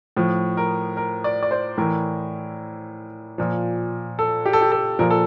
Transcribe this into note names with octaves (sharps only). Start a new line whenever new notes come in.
A2 F3
A#4
A#4
D5
D5
C5
A2 E3 A#4
A#2 F3
A4
G4
A4
G4
A4
A#2 F3 A#4
A4